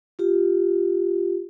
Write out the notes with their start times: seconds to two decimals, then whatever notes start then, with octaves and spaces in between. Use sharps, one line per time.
0.19 F4 G4